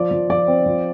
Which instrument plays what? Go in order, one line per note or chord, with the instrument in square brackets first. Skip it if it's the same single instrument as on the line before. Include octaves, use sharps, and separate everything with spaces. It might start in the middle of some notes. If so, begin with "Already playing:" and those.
Already playing: [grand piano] F3 [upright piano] D5
[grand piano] F3
[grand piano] F3 [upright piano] D5
[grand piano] C4
F3